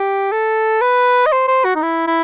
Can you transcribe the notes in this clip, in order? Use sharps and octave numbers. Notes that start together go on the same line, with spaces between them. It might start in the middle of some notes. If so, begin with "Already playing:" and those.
Already playing: G4
A4
B4
D#5
C5
C5
F#4
D#4
E4
E4